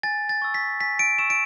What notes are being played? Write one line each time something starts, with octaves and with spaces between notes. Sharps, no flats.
G#5 A6
A6
C#6 E6
B6
G#5 B6
D7
C#6 E6 E7
D7